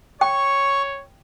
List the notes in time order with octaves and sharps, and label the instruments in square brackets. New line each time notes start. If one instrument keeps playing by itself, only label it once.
[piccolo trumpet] C#5 [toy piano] G5 [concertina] C#6